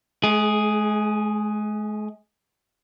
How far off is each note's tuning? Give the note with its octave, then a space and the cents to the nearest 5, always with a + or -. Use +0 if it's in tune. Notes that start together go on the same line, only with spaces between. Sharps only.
G#3 +40 G#4 +0